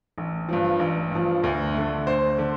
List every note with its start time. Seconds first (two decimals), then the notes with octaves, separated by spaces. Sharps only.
0.18 A1
0.49 G2 F3
0.79 A1
1.11 G2 F3
1.44 D2
1.74 D3 A3
2.06 D2 C5
2.38 D3